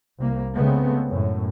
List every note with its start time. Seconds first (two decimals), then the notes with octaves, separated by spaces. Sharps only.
0.19 C2 A#3
0.54 C#3 G#3 A3 B3 C4
1.09 F#2 A2